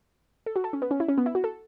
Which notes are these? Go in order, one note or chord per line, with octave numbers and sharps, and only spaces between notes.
A4
F#4
A4
C#4
B3
C#4
E4
C#4
B3
E4
F#4
A4